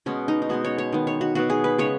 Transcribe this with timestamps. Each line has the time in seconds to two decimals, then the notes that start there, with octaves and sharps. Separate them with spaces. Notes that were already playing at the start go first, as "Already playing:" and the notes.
0.06 B2 G#3 B3 C#4
0.28 D#4
0.42 D#4
0.49 B2 G#3 B3 F#4
0.65 C#5
0.78 C#5
0.93 D#3 B3
1.07 C#5
1.21 F#4
1.35 B2 F#3 B3 F#4
1.50 G#4
1.64 B4
1.78 C#3 G#3 B3 C#5